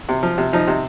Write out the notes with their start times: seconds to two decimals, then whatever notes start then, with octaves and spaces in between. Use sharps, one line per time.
0.09 C3
0.23 F3
0.38 C3
0.53 F3 D#4
0.67 C3